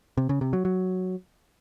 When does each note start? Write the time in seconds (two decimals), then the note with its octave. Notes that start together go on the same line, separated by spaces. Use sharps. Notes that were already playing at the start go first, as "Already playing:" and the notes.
0.17 C3
0.29 C#3
0.41 C3
0.53 F#3
0.65 F#3